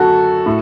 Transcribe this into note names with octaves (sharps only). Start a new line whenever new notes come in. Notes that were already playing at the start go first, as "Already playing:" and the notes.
Already playing: F#2 F#4 A4
A2